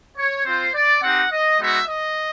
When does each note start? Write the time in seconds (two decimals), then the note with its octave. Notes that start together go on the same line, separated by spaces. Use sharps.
0.17 C#5
0.45 C4 F4 C5
0.74 D5
1.02 C4 D#4 G4 F#5
1.31 D#5
1.59 G#3 B3 D#4 F#4 E5
1.87 D#5